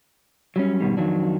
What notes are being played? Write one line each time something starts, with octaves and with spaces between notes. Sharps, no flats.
F#3 G3 C#4
G#2 B2 D#3 G3
F2 D#3 F#3 D4